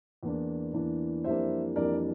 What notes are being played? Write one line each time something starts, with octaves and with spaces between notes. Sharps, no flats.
E2 E3 A#3 D4
E2 E3 A#3 D4
F2 E3 G3 A#3 D4 C5 E5
F2 E3 G3 A#3 D4 A#4 D5